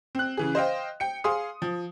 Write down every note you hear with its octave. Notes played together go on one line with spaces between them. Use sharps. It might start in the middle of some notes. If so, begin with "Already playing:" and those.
C4 F#6
C#3 E3 G#4
C5 D#5 F5 G5
G5 C#7
G#4 F5 C6 D#6
F3